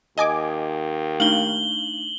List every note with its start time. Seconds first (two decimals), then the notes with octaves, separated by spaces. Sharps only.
0.18 D#2 D#5 G#5 D6
1.20 A3 D4 D#4 F5 F#7 G7